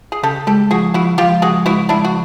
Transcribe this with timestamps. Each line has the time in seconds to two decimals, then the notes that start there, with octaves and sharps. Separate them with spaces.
0.12 G#4
0.23 C#3 G4 A4
0.47 G#3 G4 A4
0.71 F3 F#4 G#4
0.94 F3 E4 F#4
1.18 F3 F4 G4
1.42 C#3 F#4 G#4
1.65 G#3 E4 F#4
1.89 G#3 D4 E4
2.04 F#4